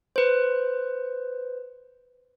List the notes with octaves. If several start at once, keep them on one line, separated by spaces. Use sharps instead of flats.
B4 C5